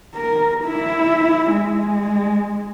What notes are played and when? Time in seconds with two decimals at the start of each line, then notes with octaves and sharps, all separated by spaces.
0.16 A#4
0.65 E4 E5
1.51 G#3